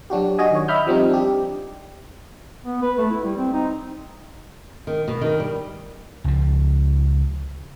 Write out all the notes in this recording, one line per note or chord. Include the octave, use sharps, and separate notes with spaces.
F#3 D4 F#4 G4
F#4 D#5 G#5
D#3 C#5
D#5 E5 B5 F6 G6
F3 G3 C4 D#4
D4 G4
B3
B4
A3
E4
G3
C4
D#4
D#3
B2
D#3
G3
C#2 F3